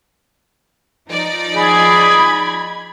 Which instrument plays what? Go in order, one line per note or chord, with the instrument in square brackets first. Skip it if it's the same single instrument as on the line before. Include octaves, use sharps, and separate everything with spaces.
[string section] F3 D#4 D5
[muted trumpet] G#4 [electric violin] B5 G#6